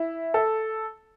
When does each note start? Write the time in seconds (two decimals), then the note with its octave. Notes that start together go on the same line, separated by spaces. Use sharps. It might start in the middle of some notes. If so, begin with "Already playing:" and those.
Already playing: E4
0.34 A4